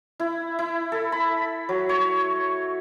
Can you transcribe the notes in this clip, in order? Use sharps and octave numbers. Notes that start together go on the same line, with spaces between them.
E4
E4
A4
B5
F#3
C#5